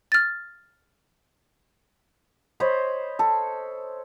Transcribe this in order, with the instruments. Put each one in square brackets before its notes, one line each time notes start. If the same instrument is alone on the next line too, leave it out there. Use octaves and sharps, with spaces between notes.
[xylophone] F6 A6
[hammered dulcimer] C5 C#5 D#5 B5
A4